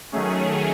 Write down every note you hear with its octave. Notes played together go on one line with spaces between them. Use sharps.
D#3 F#3 A3 C#4 G#4